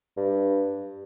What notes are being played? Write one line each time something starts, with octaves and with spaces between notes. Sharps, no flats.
G2